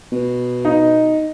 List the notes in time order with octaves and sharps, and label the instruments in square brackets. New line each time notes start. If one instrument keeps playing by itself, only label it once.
[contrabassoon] B2
[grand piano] D#4